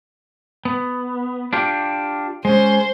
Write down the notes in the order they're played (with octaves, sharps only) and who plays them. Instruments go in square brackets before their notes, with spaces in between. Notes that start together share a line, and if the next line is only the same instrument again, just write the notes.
[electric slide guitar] B3
D4 F4 G4
[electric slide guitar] G#3 C#4 [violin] C5